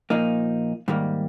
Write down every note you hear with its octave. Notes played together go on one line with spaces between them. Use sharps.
A#2 F3 A#3 D#4
G#2 D#3 G3 A#3